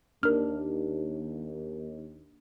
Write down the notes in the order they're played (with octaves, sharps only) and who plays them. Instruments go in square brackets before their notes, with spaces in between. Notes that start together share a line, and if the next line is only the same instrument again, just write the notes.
[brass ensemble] D#2 [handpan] D4 [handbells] A#4 F6